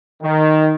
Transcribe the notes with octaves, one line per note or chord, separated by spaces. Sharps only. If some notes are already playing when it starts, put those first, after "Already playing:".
D#3